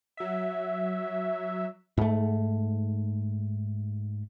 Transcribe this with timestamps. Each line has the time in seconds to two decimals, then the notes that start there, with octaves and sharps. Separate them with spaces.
0.17 F#3 E5
1.98 G#2 A3